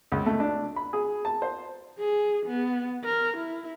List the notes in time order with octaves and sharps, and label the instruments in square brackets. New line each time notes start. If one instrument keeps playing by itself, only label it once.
[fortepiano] C#2
A3
D4
B5
G#4
A5
C5
[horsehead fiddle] G#4
B3
A#4
E4